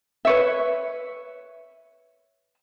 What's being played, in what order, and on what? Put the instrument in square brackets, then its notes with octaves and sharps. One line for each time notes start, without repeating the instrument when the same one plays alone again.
[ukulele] B4 C#5 E5